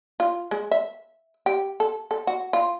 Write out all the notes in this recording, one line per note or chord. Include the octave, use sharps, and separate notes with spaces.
F4
G#3
E5
G4
A4
A4
F#4
F4